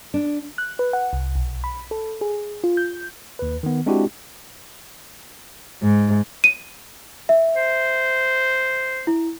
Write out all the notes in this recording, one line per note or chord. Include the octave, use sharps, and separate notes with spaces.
D4
F#6
B4
F#5
C2
B1
B5
A4
G#4
F4
G6
D#2 B4
D#3 B3
G#3 C4 D4 E4 F#4 G4
G#2
D#7
E5
C5
E4